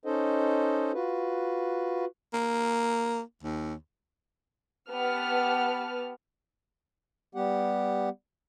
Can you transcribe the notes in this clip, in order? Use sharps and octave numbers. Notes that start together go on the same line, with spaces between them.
C#4 D#4 A4 C5 D#5
F4 F#4 B4
A#3
D#2
B3 G4 B4 A5 F6
G3 B3 G4 F#5